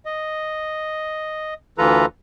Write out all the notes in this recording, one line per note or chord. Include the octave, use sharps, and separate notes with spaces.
D#5
D2 E3 F4 A4 B4 A#5